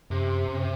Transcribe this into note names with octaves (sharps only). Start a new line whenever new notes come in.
F#2 C3
F#2